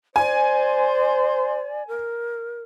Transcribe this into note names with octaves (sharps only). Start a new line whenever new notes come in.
C5 D5 G#5
A#4